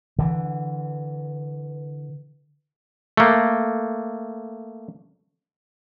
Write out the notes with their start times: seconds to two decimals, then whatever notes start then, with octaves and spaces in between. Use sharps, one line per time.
0.19 D3 E3
3.17 A3 A#3